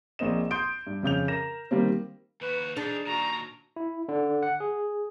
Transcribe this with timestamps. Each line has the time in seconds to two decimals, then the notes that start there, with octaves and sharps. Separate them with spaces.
0.19 A#1 A#3 C4 D#5 E7
0.51 C6 D#6 G6 D7
0.87 G2
1.03 F2 C#3 G6 F7
1.28 A#4 A#6 E7
1.71 D#3 G3 A#3 C4
2.41 D#2 F#4 B4
2.77 E3 D4 D#4 G#4
3.07 A#2 D#3 F#4 A#5
3.76 E4
4.08 D3
4.43 F#5
4.60 G#4